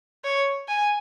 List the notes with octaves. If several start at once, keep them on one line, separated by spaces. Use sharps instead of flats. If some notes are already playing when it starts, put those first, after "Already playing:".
C#5
G#5